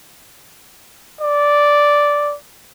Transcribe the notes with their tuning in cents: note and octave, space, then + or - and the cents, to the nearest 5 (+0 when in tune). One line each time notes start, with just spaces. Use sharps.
D5 -5